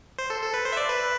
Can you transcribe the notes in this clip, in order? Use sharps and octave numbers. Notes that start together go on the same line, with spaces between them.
C5
A4
A4
B4
C5
E5
D5
B4